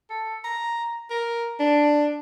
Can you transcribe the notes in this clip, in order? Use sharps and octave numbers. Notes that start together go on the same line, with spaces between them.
A4
A#5
A#4
D4